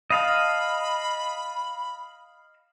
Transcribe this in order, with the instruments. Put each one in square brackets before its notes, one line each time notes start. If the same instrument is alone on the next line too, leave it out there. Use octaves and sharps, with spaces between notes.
[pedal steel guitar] D#5 F5 A5 [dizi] B5